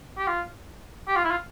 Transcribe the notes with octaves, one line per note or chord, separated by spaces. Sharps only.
G4
F4
G4
F4
E4
F4